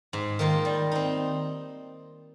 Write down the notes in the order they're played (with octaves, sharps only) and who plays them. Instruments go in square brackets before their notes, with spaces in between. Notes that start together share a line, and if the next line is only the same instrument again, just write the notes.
[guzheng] G#2
D#3 A#3 F4 A#4
G3
C4 D#4